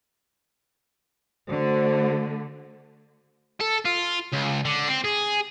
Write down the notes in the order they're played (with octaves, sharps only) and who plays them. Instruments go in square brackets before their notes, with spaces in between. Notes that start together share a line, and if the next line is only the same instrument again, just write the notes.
[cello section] D3 A3 [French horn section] F#4 C5
[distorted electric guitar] A4
F4
C#2
D3
C4
G#4